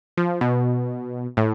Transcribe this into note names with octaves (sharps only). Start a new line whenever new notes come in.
F3
B2
A2